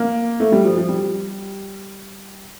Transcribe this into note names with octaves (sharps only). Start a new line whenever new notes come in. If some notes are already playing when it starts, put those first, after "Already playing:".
Already playing: A#3
A3
G3
F3
F3
G3